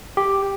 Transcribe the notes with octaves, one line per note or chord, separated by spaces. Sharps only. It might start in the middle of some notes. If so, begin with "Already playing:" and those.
G4